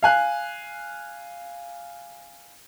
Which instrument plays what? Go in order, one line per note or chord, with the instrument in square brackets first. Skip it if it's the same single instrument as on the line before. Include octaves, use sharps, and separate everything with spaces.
[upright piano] F5 G#5 F#6